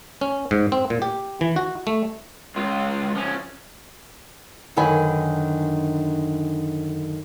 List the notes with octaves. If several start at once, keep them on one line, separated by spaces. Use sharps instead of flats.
C#4
G#2
C4
A#2
G4
E3
F#4
A3
C#2 F4
F3 C#4
F#2 D3 D#3 B4 G#5